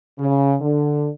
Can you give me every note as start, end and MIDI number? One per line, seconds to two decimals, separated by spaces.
0.19 0.55 49
0.61 1.08 50